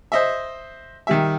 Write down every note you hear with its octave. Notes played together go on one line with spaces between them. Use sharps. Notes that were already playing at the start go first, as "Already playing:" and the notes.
C5 D#5 E5
D#3 G3 E5